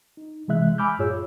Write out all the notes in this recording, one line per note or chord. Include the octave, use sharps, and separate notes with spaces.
D#4
C3 E3 G#3 E5 F#6
G#5 B5 D6 E6 F6 G6
F#2 A2 F4 G#4 C#5 E6